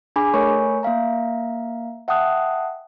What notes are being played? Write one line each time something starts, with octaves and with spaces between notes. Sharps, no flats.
D4 G#4 G#5 B5 D6
A3 A#4 C#5 G#5 B5 C#6
A#3 E5 F5 A#5
E5 F#5 G5 A5 D#6 F#6